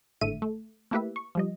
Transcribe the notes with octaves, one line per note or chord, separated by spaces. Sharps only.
G#1 A2 D3 A3 E5 D#7
A3
A3 A#3 E4 G4 B4 E5
C#6
F3 G3 D#5